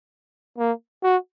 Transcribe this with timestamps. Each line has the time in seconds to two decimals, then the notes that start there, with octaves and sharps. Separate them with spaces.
0.58 A#3
1.03 F#4